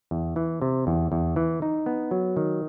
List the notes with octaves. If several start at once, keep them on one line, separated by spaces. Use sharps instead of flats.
E2
E3
C3
E2
E2
E3
D#4
B3
F#3
D#3